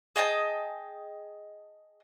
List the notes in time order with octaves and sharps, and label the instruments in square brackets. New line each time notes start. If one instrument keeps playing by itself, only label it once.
[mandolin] G#4 D#5 G5 A5